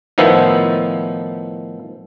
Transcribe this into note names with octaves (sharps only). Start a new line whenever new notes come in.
A2 D#3 F3 B3 E4